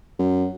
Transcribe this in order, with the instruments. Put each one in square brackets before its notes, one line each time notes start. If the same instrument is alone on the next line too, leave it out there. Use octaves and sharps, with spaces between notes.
[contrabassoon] F#2